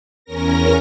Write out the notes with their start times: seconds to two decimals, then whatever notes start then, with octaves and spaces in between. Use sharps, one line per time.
0.25 E2 C#4 A#4 A#6